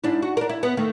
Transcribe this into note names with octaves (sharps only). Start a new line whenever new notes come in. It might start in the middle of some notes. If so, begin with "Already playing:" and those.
G#2 D4 E4
F#4
D4 A#4
E4
B3
D#3 A3